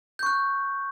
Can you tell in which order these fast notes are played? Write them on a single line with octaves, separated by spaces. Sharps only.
G6 C#6 F#6